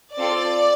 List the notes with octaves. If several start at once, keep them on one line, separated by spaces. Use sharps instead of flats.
C4 F4 A4 D5